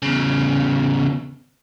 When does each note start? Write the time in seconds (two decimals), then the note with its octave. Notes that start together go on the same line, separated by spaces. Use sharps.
0.02 E2 C#3